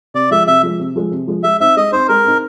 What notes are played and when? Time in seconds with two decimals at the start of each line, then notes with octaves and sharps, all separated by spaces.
0.14 C3 D5
0.31 F3 G#3 E5
0.47 C3 E5
0.63 F3 G#3
0.79 C3
0.96 F3 G#3
1.11 C3
1.27 F3 G#3
1.44 G#3 E5
1.60 C4 D#4 E5
1.77 G#3 D#5
1.92 C4 D#4 C5
2.09 G#3 A#4
2.25 C4 D#4